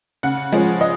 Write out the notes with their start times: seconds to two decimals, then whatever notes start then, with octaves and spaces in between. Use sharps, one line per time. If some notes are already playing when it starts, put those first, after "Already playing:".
0.23 C#3 F#5
0.52 F3 G#3 C#4
0.81 D#5